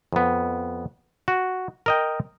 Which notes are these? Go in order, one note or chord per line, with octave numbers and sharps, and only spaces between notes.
F2 B3
F#4
A#4 D#5 G5